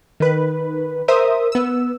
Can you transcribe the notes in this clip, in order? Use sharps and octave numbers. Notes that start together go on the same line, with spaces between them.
D#3 B4
A#4 C5 E5 D#6
B3 E6